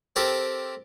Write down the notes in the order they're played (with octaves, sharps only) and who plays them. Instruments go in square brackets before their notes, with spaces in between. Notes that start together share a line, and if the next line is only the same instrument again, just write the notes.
[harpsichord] C4 G4 A4 A#4